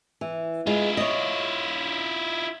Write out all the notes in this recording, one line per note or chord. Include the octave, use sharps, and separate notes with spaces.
E3
G#3 E4 F4
C#5 D#5